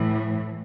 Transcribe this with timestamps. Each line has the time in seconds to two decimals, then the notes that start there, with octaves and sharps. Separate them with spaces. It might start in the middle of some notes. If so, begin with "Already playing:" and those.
Already playing: A2 E3